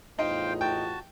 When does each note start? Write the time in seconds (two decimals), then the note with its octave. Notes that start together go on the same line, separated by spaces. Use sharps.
0.19 E2 A2 D#4 F4 C5 F5 G5
0.61 F#4 G5 A5